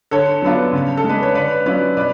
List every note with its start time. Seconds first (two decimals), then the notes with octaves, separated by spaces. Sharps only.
0.11 D3 A4 C#5
0.42 F#3 B3 D4 F4
0.73 C#3
0.97 A4
1.04 G#3
1.09 D4 B4
1.23 C#5
1.34 D3 B4 D5
1.66 F#3 C#4 F4 B4 D5
1.97 B2 B4 D5